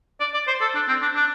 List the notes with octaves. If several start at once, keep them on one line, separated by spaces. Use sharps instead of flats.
D5
D5
C5
A4
D4
C4
D4
D4